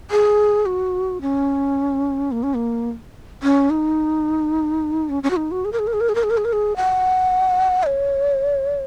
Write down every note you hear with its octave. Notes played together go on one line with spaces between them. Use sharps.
G#4
F#4
C#4
A#3
C#4
A#3
C#4
D#4
C#4
C#4
F#4
D#4
F#4
G#4
A#4
G#4
A#4
G#4
A#4
G#4
A#4
G#4
A#4
G#4
A#4
G#4
F#5
D#5
C#5